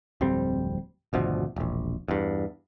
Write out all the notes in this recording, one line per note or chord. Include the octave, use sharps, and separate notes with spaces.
D1 F2 G3 C4
G#1 D2 B2 F3
E1 A#1
E2 G2